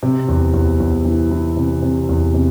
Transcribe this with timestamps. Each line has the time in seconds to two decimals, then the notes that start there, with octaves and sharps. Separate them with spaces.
0.03 C3
0.29 E2
0.54 E2
0.80 E2
1.05 E3
1.31 E3
1.57 C3
1.83 C3
2.09 E2
2.34 C3